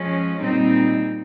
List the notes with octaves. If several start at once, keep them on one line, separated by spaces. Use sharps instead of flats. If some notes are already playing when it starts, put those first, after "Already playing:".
Already playing: F3 G#3 C#4
A#2 G3 C4 D#4